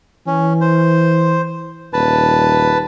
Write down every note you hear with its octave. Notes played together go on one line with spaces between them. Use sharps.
E3 C#4
C5
D#1 B4 A5